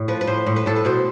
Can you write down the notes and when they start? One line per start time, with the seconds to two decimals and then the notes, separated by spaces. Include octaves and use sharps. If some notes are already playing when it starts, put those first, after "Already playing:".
Already playing: A2
0.08 F3 B4
0.21 B4
0.27 A2 C5
0.46 A2
0.56 B4
0.66 A2 A4
0.76 B4
0.85 B2 C5